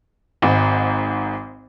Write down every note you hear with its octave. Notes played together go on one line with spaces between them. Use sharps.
G#1 G#2